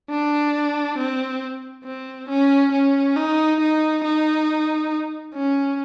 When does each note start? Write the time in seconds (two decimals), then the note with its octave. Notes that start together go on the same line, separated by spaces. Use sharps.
0.10 D4
0.98 C4
1.84 C4
2.29 C#4
2.72 C#4
3.16 D#4
3.60 D#4
4.04 D#4
5.34 C#4